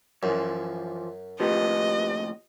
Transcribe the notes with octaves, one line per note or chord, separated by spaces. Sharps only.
F#2 E3 F3
D#2 A2 F3 F4 G4 B4 D#5